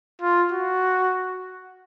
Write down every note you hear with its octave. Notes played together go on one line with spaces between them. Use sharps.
F4
F#4